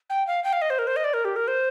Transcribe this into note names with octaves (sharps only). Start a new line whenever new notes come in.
G5
F5
G5
F5
D#5
C5
A#4
C5
D#5
D5
A#4
G4
A#4
C5